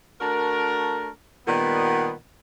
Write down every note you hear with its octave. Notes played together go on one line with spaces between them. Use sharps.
A3 D4 F#4 A#4
A#2 D#3 G3 B3